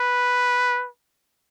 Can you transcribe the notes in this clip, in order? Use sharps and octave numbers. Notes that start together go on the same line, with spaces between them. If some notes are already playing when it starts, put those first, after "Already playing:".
Already playing: B4